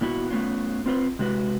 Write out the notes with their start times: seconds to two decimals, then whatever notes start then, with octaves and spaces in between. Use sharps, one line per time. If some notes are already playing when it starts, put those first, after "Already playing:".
0.01 A#2 B3 E4 F#4
0.30 A3 B3 C#4 F4
0.86 C4 F4 B4 C5
1.19 C3 G#3 F#4 B4